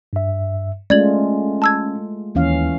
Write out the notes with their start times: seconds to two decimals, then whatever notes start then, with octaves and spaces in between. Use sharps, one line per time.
0.13 G2 E5
0.90 G#3 A3 C#4 F4 D5 G#6 F#7
1.62 A5 E6 G#6
2.35 D#2 E3 C#4 F5